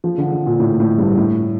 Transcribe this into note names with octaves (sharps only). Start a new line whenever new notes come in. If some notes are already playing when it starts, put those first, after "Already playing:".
F3
D3
D3
A#2
A2
A2
G2
A2